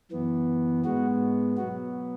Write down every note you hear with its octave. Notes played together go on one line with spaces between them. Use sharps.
F#2 E3 B3
G#2 G#3 B3 F#4
B2 F#3 B3 F#4